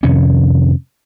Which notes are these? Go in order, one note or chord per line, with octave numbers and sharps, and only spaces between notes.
F2 C3 D#3 C#4